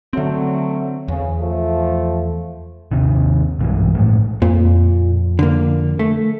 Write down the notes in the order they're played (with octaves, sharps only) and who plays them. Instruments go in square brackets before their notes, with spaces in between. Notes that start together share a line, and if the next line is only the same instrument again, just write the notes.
[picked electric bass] D3 C4 [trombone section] F#3 A3
[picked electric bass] E2 [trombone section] C#3
[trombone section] F3 A3
[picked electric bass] D#2 C3 D#3
B1 G2 E3 G#3
A2 F3 G#3 A3
[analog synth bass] F2 [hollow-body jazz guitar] A#2
[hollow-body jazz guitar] D3 A#3
A3